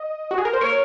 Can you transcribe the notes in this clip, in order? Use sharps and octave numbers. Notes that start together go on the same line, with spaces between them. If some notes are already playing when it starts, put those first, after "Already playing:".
Already playing: D#5
F#4
G#4
A#4
C5
A#4 C#5